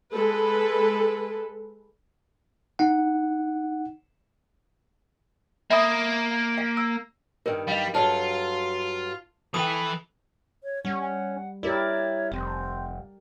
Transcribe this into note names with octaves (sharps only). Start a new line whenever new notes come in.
G#3 A4 B4
D#4 F#5
A#3 E5 B5 D#6
F5
E6
G2 D#3 A#4
G3 D#5 F5
G2 F#3 F4 A4 A5
E3 A4 B4 G5 B5 D#6
C#5
G3 C#4 F#5
E4 G4 A#4 C#5 D5
F1 C4